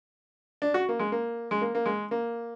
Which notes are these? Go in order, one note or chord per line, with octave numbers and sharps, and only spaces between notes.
D4
F#4
A#3
G#3
A#3
G#3
A#3
A#3
G#3
A#3